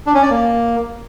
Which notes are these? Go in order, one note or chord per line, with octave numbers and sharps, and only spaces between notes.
D4
C#4
D5
A#3